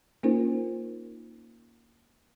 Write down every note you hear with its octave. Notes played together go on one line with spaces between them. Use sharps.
A#3 C#4 D#4 F4 A#4 C5